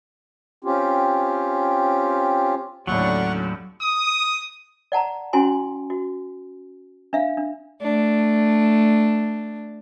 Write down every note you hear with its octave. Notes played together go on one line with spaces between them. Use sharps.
C4 C#4 F4 G4
D#2 A2 D3 F#3 C#4 D5 F#5 C#6
D#6
D5 F#5 A5 A#5
C#4 E4 F#4 G#5 C6
F#4
D4 E5 F5
D4
A3 D4